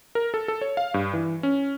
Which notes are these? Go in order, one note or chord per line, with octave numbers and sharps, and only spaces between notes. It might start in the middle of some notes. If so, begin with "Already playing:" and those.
A#4
A4
A4
C#5
F5
G2
E3
C#4